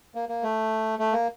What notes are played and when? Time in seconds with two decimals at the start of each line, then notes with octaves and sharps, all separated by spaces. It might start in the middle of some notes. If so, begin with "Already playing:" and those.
0.15 A#3
0.29 A#3
0.43 A3
0.99 A3
1.13 A#3